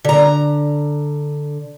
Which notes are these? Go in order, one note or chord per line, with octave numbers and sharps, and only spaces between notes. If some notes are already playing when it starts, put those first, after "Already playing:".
D3 A#5